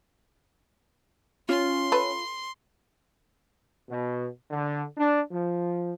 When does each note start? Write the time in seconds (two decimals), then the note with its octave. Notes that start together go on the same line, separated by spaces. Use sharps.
1.49 C#4 F4 C6
1.92 A4 B4
3.89 B2
4.51 D3
4.97 D4
5.31 F3